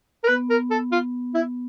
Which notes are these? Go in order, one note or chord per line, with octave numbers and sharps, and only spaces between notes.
A#4
B3 B4
A#4
A4
F4
E4